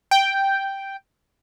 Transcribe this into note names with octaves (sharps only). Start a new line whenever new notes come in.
G5